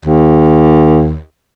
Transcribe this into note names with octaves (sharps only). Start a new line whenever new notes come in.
D#2